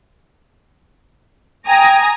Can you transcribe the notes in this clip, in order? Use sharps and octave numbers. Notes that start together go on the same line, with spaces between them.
G5 G#5 A#5 D#6